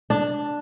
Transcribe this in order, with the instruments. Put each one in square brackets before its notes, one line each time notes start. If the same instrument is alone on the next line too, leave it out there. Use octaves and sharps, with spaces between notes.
[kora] D4